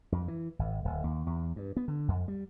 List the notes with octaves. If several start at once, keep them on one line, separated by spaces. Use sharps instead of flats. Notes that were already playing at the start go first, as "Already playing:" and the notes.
F2
E3
G#1
D1
D#2
E2
G2
B3
D3
F2
G3